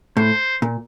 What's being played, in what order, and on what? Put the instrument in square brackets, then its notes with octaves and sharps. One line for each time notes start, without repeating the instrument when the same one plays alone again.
[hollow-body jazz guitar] A2 [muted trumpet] C5
[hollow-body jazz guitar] A#2